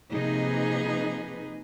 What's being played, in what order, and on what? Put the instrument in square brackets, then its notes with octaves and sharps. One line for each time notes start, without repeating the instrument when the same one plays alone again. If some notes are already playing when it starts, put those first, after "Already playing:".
[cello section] C3 F3 A#3 D#4 G#4 B4